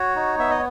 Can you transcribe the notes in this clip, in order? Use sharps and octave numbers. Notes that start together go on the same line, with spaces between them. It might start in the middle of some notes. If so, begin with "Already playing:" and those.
Already playing: F#4 C#5
D#4
B3 E5
D#5